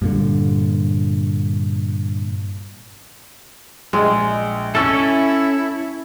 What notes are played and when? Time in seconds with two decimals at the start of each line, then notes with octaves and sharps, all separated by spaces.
0.02 G2 A#2 D3
3.93 A#1 G#3
4.75 C#4 E4 A4 C#6 E6 A6